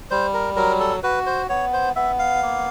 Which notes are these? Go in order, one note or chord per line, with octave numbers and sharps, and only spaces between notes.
G3 C5
A#4
F#3 A#4
A4
F#4 B4
C5
B3 C#5
C5
B3 E5
F5
A#3